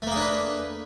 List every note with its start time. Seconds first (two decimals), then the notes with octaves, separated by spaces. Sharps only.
0.02 A3
0.07 A#3
0.11 G#4
0.16 D4
0.21 B4